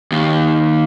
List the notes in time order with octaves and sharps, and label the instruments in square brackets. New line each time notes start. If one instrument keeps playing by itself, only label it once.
[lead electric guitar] D#2